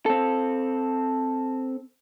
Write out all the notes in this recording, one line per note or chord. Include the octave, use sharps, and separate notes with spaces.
C4 A4